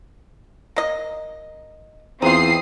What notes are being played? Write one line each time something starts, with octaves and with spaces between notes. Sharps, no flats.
A#3 D#5
E2 C4 D#4 F4 D#6 C7